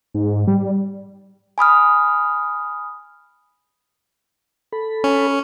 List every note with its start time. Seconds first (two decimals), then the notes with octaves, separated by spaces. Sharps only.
0.14 G#2
0.47 G3
1.58 G#5 B5 D#6 F6
4.72 A4 B5
5.04 C#4